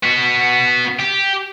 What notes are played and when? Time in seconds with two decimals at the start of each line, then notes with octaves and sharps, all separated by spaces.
0.03 B3 F#4
0.99 G4